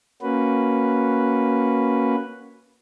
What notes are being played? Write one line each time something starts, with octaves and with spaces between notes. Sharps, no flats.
A#3 C#4 F#4 B4